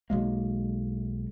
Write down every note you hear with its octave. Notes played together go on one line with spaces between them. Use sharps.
B1 G#3 A#3